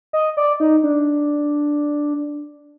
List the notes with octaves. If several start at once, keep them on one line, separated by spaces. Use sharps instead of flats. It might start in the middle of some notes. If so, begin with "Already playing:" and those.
D#5
D5
D#4
D4